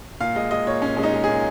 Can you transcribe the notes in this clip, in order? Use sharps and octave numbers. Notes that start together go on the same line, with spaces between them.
A#2 F5
G#3 D#5
G#3 D#5
A#2 C#5
A#2 C#4
G#3 C#4
D#4
G#3
G#4
A#2